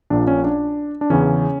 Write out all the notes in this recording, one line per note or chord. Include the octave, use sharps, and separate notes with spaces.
A#1 A#2 D4
C#4
D4
D4
E2 C#3 E3 C#4